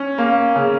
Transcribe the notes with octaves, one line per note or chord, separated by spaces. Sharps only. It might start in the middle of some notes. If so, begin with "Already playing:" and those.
Already playing: C#4
A#3
C#3